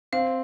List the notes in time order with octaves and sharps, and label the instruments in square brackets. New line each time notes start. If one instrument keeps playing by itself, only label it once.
[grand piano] C4 [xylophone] F5